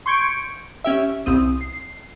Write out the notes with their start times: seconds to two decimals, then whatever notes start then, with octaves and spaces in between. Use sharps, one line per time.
0.06 C6 C#6 G6 G#6 C#7 D7
0.84 C#4 G4 E5
1.26 C2 C4 D#6
1.61 C7